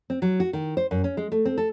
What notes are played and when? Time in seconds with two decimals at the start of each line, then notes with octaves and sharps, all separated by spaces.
0.10 C4
0.22 F#3
0.40 F#4
0.53 D#3
0.77 C5
0.91 F#2
1.04 C#4
1.17 G#3
1.32 A3
1.45 C4
1.58 A4